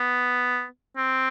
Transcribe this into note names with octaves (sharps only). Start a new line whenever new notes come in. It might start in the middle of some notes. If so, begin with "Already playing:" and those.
Already playing: B3
C4